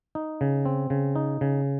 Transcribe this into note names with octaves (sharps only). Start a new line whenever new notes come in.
D#4
C#3
C4
C#3
D#4
C#3